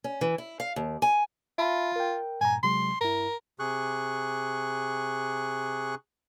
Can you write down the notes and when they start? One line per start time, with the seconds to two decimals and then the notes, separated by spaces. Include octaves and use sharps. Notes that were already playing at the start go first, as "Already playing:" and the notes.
0.04 C#4
0.21 E3
0.38 E4
0.60 F5
0.76 D#2
1.02 G#5
1.58 F4 E5 A5 B5
1.96 A#4 G5
2.41 G2 A#2 G#5 A#5
2.63 C3 F#3 G#3 C6
3.01 G2 E4 A#4
3.59 C3 G#4 C#6 F#6